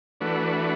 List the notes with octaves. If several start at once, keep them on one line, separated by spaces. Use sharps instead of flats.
E3 A3 D4 F#4 B4